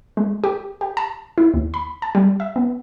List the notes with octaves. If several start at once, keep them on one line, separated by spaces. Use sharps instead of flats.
G#3
G4
G4
A5
E4
D#2
B5
A5
G3
E5
B3